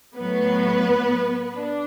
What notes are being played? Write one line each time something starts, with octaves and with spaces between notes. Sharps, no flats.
A2 F#3 B3 B4
D4